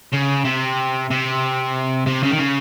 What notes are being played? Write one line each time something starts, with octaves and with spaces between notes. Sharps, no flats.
C#3
C3
C3
C3
C#3
D#3
C#3